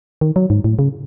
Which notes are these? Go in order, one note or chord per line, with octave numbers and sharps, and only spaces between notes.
D#3
F#3
G#2
A2
C#3